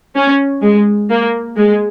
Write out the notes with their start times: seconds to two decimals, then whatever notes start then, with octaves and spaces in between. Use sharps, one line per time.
0.16 C#4
0.63 G#3
1.10 A#3
1.57 G#3